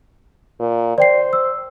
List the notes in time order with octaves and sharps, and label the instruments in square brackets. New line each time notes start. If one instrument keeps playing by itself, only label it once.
[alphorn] A#2
[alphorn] C5 [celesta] D5 G5 C7
[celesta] E6